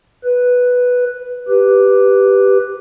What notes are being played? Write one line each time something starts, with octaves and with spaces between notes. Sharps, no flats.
B4
G4 B4